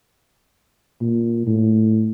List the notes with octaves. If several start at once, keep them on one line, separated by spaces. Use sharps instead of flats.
A#2
A2